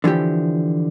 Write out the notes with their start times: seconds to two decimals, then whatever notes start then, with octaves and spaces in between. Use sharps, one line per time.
0.04 D3 E3 F3 G4